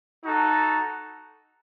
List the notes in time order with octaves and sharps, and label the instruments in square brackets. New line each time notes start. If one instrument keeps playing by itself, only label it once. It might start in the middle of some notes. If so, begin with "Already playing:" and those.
[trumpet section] D#4 F#4 A4